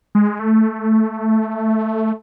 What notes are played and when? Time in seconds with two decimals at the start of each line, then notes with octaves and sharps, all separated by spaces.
0.15 G#3
0.39 A3